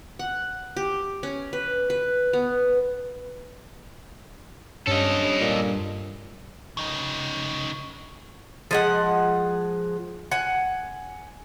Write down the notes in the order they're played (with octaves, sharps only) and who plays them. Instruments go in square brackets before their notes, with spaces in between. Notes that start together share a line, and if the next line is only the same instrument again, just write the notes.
[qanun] F#5
G4
C#4
B4
B4
B3
[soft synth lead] G2 [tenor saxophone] C#4 [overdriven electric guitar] A4 D#5
[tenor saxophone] A#2
[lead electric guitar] C#3 D#4
[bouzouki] F3 G#3 F#5
F#5 G#5